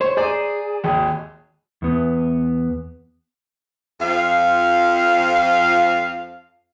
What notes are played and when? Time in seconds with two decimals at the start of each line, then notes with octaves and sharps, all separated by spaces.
0.01 C5 C#5
0.17 G#4 C5 D5 A#5
0.84 G#1 D#2 G#4
1.82 E2 B3
4.01 F2 F3 F5